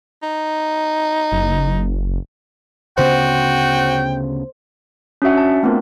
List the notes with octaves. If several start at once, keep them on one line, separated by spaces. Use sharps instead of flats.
D#4
F#1
D2 C#3 B3 F#4 C5 G5
C#4 D4 F#4 E5 F#5
A5
A3 B3 C4 D4 F4 A#4